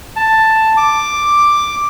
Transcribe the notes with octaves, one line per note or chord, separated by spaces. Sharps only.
A5
D6